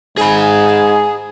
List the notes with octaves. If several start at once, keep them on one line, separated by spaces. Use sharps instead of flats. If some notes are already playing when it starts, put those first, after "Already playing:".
G#2 G#4 G#5 B5